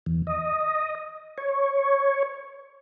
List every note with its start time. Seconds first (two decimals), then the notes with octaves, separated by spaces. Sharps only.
0.06 E2
0.27 D#5
1.38 C#5